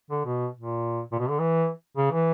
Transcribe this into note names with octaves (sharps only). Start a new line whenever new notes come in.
D3
B2
A#2
A#2
B2
D3
E3
C#3
E3